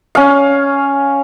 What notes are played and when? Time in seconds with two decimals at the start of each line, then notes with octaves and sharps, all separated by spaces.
0.15 C#4 F5